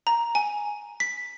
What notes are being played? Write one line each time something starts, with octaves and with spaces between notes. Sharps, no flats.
A#5
G#5
B6